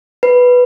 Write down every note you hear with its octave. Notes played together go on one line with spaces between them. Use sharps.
B4